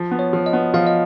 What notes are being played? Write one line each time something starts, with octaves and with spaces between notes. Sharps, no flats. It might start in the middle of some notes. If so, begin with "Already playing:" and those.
Already playing: F3
B3
C#5
F3
D#5
B3
F3 F5
D#5